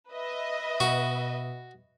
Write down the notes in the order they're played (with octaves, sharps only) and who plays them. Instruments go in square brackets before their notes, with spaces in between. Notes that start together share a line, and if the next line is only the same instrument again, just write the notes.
[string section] B4 D#5 E5
[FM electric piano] B2 [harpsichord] F#4